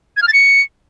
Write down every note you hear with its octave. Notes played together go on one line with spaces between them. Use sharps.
G#6
F6
A6
C#7